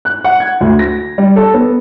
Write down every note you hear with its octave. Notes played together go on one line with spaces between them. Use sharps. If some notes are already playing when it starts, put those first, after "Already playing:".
F#6
F#5
G#6
D2
A#6
G3
A4
B3